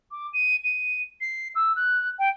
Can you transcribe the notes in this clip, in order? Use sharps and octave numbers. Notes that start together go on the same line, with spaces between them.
D6
D#7
D#7
C7
E6
F#6
G5